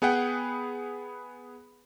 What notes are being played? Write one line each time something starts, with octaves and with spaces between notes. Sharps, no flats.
B3 G#4 B4 F#5 G5